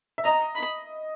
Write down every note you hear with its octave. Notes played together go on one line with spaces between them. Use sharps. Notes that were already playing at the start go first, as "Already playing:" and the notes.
E5
D#5 A#5
B5